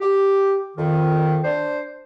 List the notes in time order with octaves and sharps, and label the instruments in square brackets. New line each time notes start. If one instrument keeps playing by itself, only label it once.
[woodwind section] G4
F2 D#3
D4 C5